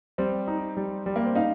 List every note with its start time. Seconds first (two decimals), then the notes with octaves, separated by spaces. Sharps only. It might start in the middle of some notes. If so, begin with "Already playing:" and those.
0.18 G3 C4
0.48 D#4
0.77 G3
1.06 G3
1.16 A#3
1.26 C4
1.35 D#4 F5